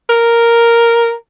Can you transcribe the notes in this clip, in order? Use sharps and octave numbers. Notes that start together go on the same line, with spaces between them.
A#4